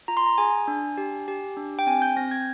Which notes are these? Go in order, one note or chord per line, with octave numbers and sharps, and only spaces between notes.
F4 A#5
C6
A#5
G#4 G#5
D4
G4
G4
D4
G5
C4 G#5
G6
C4 A#6
G#6